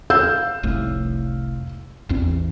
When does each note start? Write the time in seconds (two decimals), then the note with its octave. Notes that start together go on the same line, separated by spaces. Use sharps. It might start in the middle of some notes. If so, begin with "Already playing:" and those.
0.10 F5 E6 G6
0.63 F1 C2 A2
2.09 A1 E2 C4